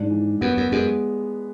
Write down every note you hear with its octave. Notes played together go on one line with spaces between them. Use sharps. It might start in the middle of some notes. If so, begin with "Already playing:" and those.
Already playing: G#2 D4
E3
F#2 B3
F#2
F#2 G#3